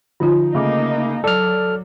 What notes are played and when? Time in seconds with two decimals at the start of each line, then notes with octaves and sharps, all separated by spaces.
0.20 D3 F3 D#4 F4
0.55 C#3 A3 A#3 D#4 D6
1.24 F#3 A4 D5 F6